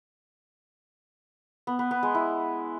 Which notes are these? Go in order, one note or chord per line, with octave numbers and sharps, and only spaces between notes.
B3
B3
B3
G#3
E4